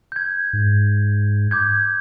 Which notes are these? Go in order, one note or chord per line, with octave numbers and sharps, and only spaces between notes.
G6 G#6
G#2
D6 G6 G#6